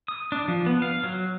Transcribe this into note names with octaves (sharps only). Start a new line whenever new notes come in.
D#6
D4
F3
B3
F5
F#3